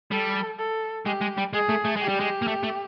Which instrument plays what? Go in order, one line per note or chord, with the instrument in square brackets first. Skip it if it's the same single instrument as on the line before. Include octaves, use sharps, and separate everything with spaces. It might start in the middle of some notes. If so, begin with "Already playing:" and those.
[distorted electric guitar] G3 [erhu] A4
[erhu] A4
[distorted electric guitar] G#3 [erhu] G4
[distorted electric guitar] G#3
G3
[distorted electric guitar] G#3 [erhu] G#4
[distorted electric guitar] A3
A3
[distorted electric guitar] G#3 [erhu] G4
[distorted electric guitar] G3
G#3
A#3
A3
A3